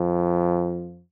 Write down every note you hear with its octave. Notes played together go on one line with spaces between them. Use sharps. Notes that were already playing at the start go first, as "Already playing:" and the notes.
Already playing: F2 F3